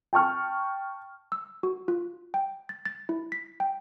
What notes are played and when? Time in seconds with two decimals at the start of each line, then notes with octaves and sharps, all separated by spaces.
0.13 G5 A5 C#6 F6
1.32 E6
1.63 F#4
1.88 F4
2.34 G5
2.69 A6
2.85 A6
3.09 E4
3.32 B6
3.60 G5